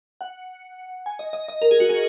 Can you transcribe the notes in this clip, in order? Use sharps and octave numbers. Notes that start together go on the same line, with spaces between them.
F#5
G#5
D#5
D#5
D#5
A#4
G#4
F#4
G#4